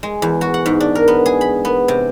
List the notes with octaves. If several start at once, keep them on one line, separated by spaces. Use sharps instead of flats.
G#3
E2
F#4
F#5
G#2
D4
A#4
B3
G#4
B5
B3
C3